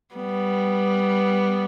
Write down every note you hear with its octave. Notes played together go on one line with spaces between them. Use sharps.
G3 B3